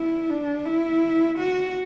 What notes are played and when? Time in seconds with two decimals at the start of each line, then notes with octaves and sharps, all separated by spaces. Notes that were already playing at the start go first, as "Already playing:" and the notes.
Already playing: E4
0.30 D4
0.65 E4
1.39 F#4